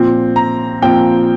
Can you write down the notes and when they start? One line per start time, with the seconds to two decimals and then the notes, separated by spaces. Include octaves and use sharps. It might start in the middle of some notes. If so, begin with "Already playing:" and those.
Already playing: A#2 F3 C4
0.36 A#5
0.82 A#2 F3 C4 G5